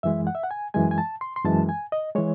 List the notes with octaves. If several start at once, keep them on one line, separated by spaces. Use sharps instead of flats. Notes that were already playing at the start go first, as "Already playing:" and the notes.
F#2 E3 G#3 E5
F#5
E5
F#5
G#5
F#2 E3 G#3 G#5
G#5
A5
C6
C6
F#2 E3 G#3 A5
G#5
D#5
E3 G#3 C#5